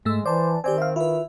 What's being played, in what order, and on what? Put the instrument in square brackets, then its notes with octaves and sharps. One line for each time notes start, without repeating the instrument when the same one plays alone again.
[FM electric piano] G#2 A3 E6 [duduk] G#3
[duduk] E3 [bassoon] C5 [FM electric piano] D5 A5
[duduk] D#3 [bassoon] C4 [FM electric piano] G4 D5 G#5
[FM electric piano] E5 F5
[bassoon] E4 [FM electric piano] F4 B4